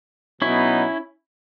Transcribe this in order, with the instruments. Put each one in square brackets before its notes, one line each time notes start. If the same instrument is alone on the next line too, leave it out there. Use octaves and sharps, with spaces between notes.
[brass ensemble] B2 F#3 B3 D#4 [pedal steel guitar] C#4 E4